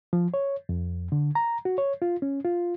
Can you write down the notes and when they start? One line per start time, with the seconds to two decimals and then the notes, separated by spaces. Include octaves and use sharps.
0.13 F3
0.34 C#5
0.69 F2
1.12 D3
1.35 A#5
1.65 F#4
1.78 C#5
2.02 F4
2.22 C#4
2.45 F4